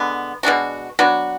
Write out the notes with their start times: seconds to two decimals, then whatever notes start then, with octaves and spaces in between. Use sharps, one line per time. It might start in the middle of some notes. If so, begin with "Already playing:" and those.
Already playing: D3 G#3 B3
0.43 B2 G#3 D4 F#4
0.99 F#3 B3 D4 F#4